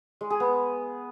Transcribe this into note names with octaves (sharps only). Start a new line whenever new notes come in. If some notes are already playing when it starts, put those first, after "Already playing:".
G#3
G#4
B3